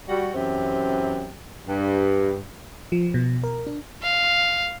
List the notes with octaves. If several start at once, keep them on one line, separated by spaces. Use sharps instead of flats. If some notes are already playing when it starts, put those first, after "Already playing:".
G3 F#4
F#2 E3 C4 G4
G2
F3
B2
A#4
D4
F5